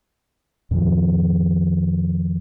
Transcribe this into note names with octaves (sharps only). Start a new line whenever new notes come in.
F2 A#2 D#3 F3